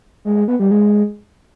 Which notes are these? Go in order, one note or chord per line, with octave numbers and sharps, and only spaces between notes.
G#3
G#3
B3
G3
G#3